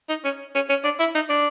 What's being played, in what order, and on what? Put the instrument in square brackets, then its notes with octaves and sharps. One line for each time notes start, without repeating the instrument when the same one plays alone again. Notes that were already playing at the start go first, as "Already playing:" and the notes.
[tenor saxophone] D#4
C#4
C#4
C#4
D4
E4
D#4
D4